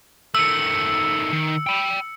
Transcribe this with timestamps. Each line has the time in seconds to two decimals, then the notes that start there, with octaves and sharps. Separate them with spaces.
0.35 D#3 A3 E6 C#7
1.33 D#3
1.67 G5 B5